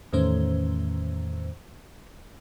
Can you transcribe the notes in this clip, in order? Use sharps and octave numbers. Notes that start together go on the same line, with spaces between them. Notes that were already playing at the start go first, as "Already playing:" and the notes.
E2 A2 D#3 A3 C#4 C5